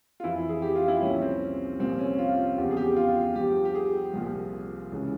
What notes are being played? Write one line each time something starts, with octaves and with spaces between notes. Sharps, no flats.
F4
F2 E3 E4
G#4
G4
F4
E4
C2 A#2 F3 C#4
C4
C2 A#2 F3 C4
C#4
F4
E2 C#3 F3 G4
G#4
G4
F4
G2 F3 G4
G4
G#4
C2 A#2 F3
C#2 C#3 E3